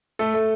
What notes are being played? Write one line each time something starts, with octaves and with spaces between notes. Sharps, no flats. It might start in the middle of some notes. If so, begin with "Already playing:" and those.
A3 A4
A3